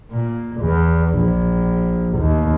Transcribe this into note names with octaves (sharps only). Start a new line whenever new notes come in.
A#2
E2
A#1
D#2